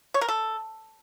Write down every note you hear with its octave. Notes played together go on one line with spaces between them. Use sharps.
C#5
A#4
A4